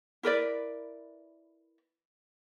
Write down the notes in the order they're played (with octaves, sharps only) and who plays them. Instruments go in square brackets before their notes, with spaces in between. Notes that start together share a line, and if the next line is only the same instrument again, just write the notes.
[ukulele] E4 A#4 B4 D5